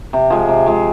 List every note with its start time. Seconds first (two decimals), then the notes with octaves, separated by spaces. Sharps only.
0.13 C3
0.30 F3 G#3
0.48 C3
0.66 F3 G#3